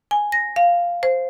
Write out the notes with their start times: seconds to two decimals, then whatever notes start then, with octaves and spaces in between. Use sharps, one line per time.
0.11 G#5
0.32 A#6
0.56 F5
1.03 C5